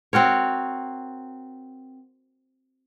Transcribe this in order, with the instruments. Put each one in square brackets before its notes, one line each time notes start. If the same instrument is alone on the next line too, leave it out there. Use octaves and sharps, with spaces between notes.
[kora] C4 F#4 A#4 C#5